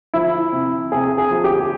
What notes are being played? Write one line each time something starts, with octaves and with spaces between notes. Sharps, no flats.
F3 E4
C3
C3 G#4
G#4
F3
G4